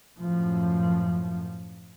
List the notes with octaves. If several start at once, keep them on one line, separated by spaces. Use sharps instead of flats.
F#2 A2 F3